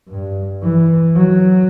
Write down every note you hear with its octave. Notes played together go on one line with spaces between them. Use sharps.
G2
E3
F#3